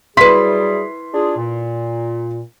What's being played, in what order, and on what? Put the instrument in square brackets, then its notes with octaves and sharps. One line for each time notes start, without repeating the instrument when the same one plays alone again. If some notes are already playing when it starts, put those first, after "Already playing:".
[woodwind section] F#3 G3 G#4 [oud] E4 B4 [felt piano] C6 B6
[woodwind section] D4 F4 G#4
A#2